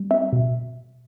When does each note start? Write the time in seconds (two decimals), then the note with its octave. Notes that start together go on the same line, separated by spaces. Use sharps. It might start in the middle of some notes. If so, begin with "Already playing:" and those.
Already playing: G3
0.11 C4 E5
0.33 B2